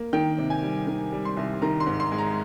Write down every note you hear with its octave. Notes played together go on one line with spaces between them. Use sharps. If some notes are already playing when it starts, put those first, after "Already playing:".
Already playing: A#3
D#3 G5
C3
G#5
G3
D#3
G3
C6
C2
D#3 A#5
C6
G#2
C6
G#3
A#5